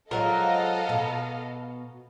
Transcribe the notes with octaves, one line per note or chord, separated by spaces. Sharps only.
F3 F#3 G#3 A4 A#4 D#5 F5
B2